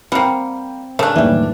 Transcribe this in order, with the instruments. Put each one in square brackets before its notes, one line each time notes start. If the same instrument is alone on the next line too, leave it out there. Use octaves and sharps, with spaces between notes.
[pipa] G3 A#3 [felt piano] C4 G5 [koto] F#5
[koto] C#3 [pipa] A3 D4 [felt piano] A#4
[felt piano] F#1 D#2 A2 [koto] E3 G3